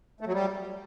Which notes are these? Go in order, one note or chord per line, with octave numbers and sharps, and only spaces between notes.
A3
F#3
G3